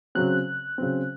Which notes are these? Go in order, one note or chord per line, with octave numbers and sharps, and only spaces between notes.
C#3 F#3 C4 F#6
C#3 F#3 C4